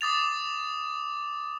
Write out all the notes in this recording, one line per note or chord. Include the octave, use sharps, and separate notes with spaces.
D6 D#6 A6 F7